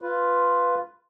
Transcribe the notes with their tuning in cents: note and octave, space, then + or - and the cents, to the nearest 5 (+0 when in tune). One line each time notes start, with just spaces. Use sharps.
F4 +0 B4 +5